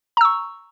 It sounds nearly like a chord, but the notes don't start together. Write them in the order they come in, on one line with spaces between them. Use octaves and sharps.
A#5 E6 C#6